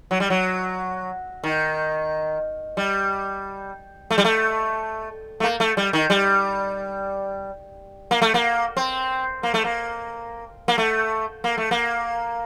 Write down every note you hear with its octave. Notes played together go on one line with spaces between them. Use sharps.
F#3
G3
F#3
D#3
G3
A3
G3
A3
A3
A#3
A3
G3
D#3
G3
A#3
A3
A#3
C4
A#3
A3
A#3
A#3
A3
A#3
A3
A#3